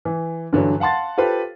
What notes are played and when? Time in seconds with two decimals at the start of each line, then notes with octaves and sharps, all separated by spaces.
0.05 E3
0.53 G2 D3 E3 F#3
0.80 F5 F#5 A5 C6 A6
1.18 F4 G4 A4 B4 C5 F5